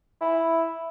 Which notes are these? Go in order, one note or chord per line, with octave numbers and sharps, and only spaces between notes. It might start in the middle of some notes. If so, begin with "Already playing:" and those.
E4